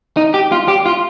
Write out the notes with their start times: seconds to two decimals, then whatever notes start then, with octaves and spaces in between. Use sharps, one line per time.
0.17 D#4
0.34 G4
0.52 F4
0.68 G4
0.86 F4